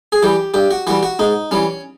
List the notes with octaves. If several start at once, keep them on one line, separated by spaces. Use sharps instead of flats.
G#4
E3 G3 G4
G2 G4
F#4
E3 G3 F#4
F#4
G#2 D#4
E3 G3 C#4